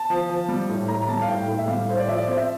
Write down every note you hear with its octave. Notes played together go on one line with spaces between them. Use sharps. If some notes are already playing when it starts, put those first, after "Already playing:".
Already playing: A5
F3
F3
G3
A2
A2 A#5
A#5
G3 A5
F5
A2 G5
A2
E5
G3 F5
A2 C5
D5
F3 E5
D5
C4 C5
E5